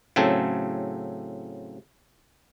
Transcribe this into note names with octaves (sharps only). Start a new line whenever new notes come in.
A2 C#3 F#3 C4 A4